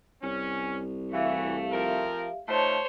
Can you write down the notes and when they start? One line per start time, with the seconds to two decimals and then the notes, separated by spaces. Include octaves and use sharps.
0.23 C2 C#4
1.13 E3 A3 F#4 G4 E5 F5
1.72 F3 C4 A#4
2.49 A3 D#4 F4 C5 C#5 A5